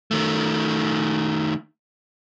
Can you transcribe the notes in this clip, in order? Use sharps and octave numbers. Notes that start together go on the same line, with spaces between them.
D#3 A3